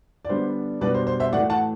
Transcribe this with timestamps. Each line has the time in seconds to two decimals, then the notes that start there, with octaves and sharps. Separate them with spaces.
0.25 D5
0.29 D3 G3 B3 D4 C5
0.81 B2 G3 D4 B4 D5
0.94 C5
1.07 C5
1.20 C5 E5
1.33 A2 E3 A3 D5 F#5
1.50 F#5 A5